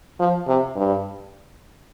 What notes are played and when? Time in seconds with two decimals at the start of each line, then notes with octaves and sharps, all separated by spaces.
0.20 F3
0.48 C3
0.76 G2